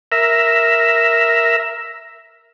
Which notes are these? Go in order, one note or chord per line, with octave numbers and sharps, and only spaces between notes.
A#4 E5